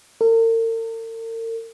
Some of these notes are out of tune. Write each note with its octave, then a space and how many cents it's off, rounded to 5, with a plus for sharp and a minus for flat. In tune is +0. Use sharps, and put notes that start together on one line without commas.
A#4 -45